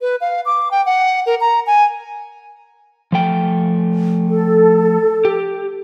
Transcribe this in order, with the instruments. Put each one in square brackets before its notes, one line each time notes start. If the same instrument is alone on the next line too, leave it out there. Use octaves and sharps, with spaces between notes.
[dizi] B4
F5
D6
G5
F#5
A#4
A#5
G#5
[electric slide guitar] F3 A3 G5
[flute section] A4
[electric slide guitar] G4